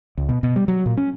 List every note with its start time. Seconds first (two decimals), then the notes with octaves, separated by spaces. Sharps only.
0.18 C#2
0.29 B2
0.43 B2
0.56 G3
0.68 F#3
0.86 A#2
0.97 C#4